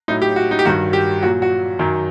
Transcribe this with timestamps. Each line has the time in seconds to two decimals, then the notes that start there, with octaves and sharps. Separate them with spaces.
0.08 A2 F#3 D#4
0.22 G4
0.36 F#4
0.51 D#4
0.59 G4
0.65 G2 D#3 F#3 F#4
0.93 G4
1.23 A#2 F#3 F#4
1.42 F#4
1.79 F#2 D#3 F#3